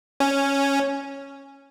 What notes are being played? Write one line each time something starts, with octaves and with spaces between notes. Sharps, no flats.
C#4